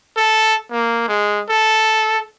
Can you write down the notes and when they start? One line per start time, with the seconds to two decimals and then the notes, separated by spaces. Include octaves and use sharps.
0.17 A4
0.71 A#3
1.08 G#3
1.49 A4